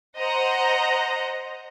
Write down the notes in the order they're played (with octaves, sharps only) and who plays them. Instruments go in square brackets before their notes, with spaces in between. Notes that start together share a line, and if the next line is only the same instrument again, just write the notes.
[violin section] C5 D#5 F#5 A#5